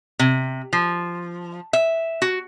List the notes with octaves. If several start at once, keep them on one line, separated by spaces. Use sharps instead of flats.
C3
F3
E5
F#4